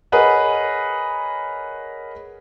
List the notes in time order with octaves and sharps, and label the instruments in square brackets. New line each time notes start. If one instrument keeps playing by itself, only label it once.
[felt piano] G#4 A#4 B4 C#5 D#5 F#5